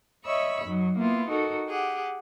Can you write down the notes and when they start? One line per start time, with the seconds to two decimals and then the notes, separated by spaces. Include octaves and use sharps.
0.24 C#5 D#5 E5 B5 C#6 E6
0.65 F#2 F#3 D#4
0.97 A#3 B3 E4 F4
1.29 D#4 F#4 A4 A#4
1.68 G4 G#4 F#5